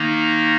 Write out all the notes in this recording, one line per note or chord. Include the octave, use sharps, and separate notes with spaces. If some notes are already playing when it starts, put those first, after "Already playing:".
Already playing: D#3 A#3 D#4